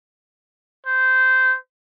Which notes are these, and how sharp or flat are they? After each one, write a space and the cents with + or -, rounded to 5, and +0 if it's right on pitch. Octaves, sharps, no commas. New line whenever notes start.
C5 -15